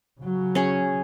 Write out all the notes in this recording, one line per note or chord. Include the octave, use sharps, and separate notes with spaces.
C#3 F#3
C#4 G#4